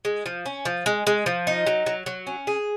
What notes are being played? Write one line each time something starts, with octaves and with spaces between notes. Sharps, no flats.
G#3
F3
C#4
F3
G#3
G#3
F3
D#4
F#3
F#3
F#3
C#4
G#4